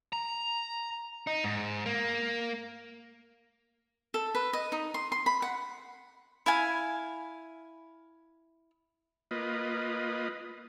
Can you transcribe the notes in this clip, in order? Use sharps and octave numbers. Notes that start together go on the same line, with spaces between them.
A#5
D#4
G#2
A#3
A4
B4
D#5
D#4
C6
C6
B5
F#5
E4 F5 G#5
A#3 F4 B4 D#5